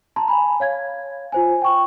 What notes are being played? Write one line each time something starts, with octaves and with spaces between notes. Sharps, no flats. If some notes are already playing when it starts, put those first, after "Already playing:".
A5 A#5 C6
G#5 B5
C#5 F5 G#6
F4 C5 G#5
G5 C#6